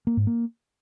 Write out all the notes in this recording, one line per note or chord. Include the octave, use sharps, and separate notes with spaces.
A#3
G#2
A#3